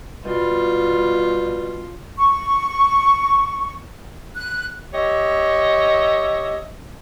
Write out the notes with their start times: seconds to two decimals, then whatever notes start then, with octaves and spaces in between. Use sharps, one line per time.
0.24 B2 G3 F4
2.17 C#6
4.35 F#6
4.94 G4 C#5 D#5 E5